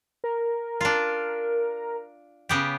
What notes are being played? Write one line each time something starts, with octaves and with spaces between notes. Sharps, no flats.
A#4
D4 F4
C#3 B3 G4